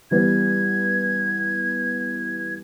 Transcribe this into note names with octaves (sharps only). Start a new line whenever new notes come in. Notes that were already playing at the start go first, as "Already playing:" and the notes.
E3 G3 B3 G#6